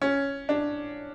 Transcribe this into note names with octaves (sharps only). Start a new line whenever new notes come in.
C#4
D4